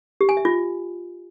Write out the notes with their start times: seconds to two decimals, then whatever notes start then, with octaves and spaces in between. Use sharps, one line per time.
0.21 G4
0.29 G#5
0.37 E5
0.45 F4